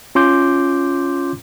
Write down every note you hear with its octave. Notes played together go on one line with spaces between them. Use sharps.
C#4 F4 C6 D6 G6